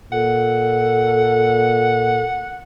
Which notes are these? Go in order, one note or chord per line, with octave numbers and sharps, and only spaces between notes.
A#2 A4 F#5